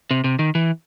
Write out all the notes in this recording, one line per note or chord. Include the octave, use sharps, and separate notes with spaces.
C3
C3
D#3
E3